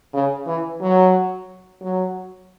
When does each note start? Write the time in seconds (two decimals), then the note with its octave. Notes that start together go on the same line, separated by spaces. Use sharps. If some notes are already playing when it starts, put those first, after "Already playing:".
0.14 C#3
0.47 E3
0.81 F#3
1.82 F#3